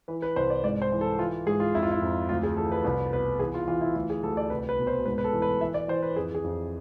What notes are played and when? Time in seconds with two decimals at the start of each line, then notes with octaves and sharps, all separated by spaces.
0.08 E3 B4
0.22 B4
0.36 C2 C5
0.50 D5
0.64 G#2 D5
0.82 C5
0.92 E3
1.01 A4
1.19 E3 F4
1.47 G#2 G#4
1.60 F4
1.74 F2 E4
1.83 F4
1.92 E4
2.02 F2
2.29 D2 F4
2.43 G#4
2.57 E3 A4
2.72 B4
2.84 C2 B4
3.13 B2 B4
3.39 E3 G#4
3.54 F4
3.68 E3 F4
3.81 E4
3.96 D2 F4
4.10 G#4
4.23 D2 A4
4.37 D5
4.50 C2 B4
4.69 B4
4.79 B2
4.87 C5
5.06 G#2 B4
5.18 B4
5.24 A4
5.33 E3
5.42 B4
5.61 E3 E5
5.74 D5
5.88 E3 C5
6.02 B4
6.16 F2 G#4
6.34 G#4
6.44 F2